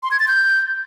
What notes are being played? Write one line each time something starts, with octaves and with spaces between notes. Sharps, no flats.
C6
G#6
A6
G6